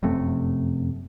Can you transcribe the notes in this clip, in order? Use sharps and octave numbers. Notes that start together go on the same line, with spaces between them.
F1 F#2 C3 A3